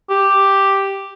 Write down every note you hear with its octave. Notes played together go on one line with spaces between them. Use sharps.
G4